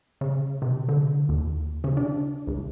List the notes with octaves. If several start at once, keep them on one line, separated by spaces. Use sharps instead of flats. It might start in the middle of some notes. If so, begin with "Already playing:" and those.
C#3
C3
D3
D#2
C#3
D4
C#2